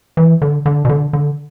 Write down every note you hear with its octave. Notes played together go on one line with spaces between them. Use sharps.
E3
D3
D3
B2
D3
D3